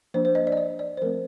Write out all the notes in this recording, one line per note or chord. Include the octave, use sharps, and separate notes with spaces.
F3 A#3 D4 C5
C5
D#5
D5
D#5
D5
D5
C5
F3 A3 C4 A#4